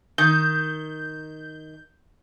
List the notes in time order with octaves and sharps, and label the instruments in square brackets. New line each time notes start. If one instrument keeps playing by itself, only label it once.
[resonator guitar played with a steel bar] D#3 [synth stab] G6